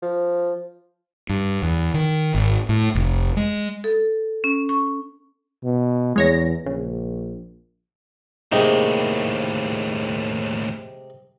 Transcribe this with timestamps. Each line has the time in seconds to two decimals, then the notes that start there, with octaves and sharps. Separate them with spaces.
0.02 F3
1.29 G2
1.62 E2
1.94 D#3
2.34 G#1
2.69 A2
2.95 F1
3.37 G#3
3.84 A4
4.44 C#4
4.69 C#6
5.64 B2
6.16 E2 G#3 C#5 A#6
6.66 A#1 C#3
8.52 D#2 A2 C3 G#3 A#3 D#4